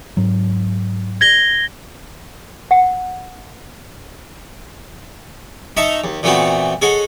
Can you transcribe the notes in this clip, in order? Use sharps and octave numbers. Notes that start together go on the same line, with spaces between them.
G#2 F#3
G#6 A#6 G7
F#5
D#4 D#5 E5 A5 A#5 C#6
D#2
A#2 E3 A3 B3 C4 F#4
G#4 A4 C#5 D#5 F#5